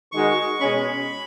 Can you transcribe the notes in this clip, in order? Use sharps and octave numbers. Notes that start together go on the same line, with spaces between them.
D#3 G#3 D#4 F#4 C#6
B2 G#3 C#4 B5